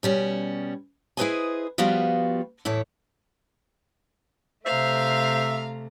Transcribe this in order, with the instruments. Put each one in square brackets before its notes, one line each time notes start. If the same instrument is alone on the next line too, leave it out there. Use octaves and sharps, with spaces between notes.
[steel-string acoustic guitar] B2 G3 C#4
E4 G#4 B4 C5 D#5 G#5
F3 G3 B3 F4 F#4 B4
E2 A2 E4 C#5
[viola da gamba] C3 A3 [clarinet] C5 [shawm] E5 [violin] F5 A#5